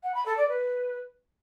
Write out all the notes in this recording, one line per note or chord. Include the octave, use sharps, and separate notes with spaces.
F#5
B5
A4
D5
B4